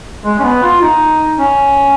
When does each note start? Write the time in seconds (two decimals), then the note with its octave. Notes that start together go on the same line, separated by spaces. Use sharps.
0.24 G#3
0.39 C#4
0.43 B3
0.63 F4
0.81 D#4
1.39 C#4